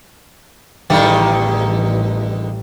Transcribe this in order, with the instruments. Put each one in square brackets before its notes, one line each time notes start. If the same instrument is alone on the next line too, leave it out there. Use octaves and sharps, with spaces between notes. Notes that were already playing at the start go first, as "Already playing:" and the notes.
[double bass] A1 [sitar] E2 D3 D#3 [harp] G3